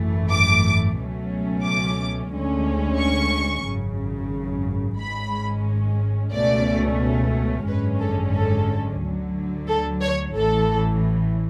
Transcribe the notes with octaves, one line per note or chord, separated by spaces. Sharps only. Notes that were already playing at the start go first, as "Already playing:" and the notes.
Already playing: G#1 F#2 E3 A3
D6
C#2 B2 F#3 A3 C#4
D6
D2 D3 G#3 C#4
C#6
G#1 F#2 C#3
G#1 G#2 G#3 C#4 B5
C#2 B2 A3 C#4 D5
G#1 F#2 D3 G#3 C#4 B4
A4
A4
D2 D3 F#3
A4
C#5
A1 A2 E3 A4